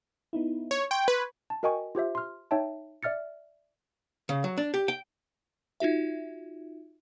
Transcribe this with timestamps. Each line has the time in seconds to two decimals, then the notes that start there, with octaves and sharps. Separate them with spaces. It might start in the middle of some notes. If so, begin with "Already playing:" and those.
0.33 B3 D#4 E4
0.71 C#5
0.91 G5 C6 C#6 G#6
1.08 B4
1.50 A5
1.63 F#4 A#4 D#5 G5 G#5 C#6
1.95 F4 G4 C5 E5
2.15 C6 F6
2.51 D#4 C#5 E5 G5 A5
3.03 D5 E5 F6 A6 C#7
4.29 C#3
4.44 F#3
4.58 D4
4.74 G4
4.88 G5
5.80 D#4 F4 F#4 E5